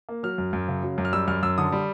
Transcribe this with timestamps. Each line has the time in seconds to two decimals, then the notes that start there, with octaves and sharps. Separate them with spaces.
0.09 A#3
0.23 F#3 F6
0.38 F#2
0.53 F#2
0.68 C#3
0.83 F#3
0.98 F#2
1.05 F6
1.12 G3 E6
1.28 F#2 F6
1.43 F#2 E6
1.58 D3 D#6
1.72 G3